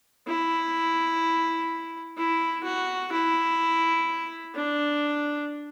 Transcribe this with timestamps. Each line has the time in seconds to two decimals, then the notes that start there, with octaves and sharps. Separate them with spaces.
0.27 E4
2.17 E4
2.64 F#4
3.12 E4
4.55 D4